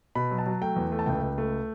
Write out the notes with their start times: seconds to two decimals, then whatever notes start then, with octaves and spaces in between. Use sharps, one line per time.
0.15 B2 B5
0.31 F#3
0.38 A5
0.46 F#3
0.61 A3 G5
0.76 E2
0.92 A3
0.99 A5
1.06 C#2 G5
1.21 C#2
1.38 A3